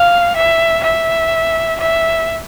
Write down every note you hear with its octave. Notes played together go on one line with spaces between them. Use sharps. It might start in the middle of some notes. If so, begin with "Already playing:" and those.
Already playing: F5
E5
E5
E5